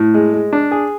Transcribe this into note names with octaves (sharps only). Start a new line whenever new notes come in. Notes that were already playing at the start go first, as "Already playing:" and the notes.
Already playing: A2
G#3
G#3
D4
G#4